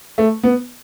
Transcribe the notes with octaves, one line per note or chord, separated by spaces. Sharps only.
A3
B3